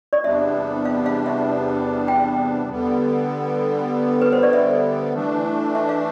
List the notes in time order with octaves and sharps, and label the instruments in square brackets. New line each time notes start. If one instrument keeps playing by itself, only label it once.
[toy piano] D5
[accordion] E2 C3 G3 B3 D4 [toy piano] E5
[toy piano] F5
F5
E5
G5
[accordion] D3 G3 B3
[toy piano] B4
C5
D5
E5
[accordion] E3 A3 D4
[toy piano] E5
F5